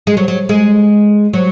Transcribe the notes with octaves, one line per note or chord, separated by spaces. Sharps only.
G#3
F#3
F#3
G#3
F#3